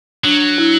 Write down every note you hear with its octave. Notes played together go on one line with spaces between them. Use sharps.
F#3 D4
E4